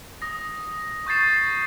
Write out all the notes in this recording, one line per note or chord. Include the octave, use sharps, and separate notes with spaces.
D#6 A#6
C#6 G6 A6 C7 E7